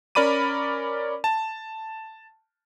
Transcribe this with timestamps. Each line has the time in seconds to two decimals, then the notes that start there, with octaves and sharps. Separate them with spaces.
0.15 C#4 A#4 D5 B5 D6 D#7
1.24 A5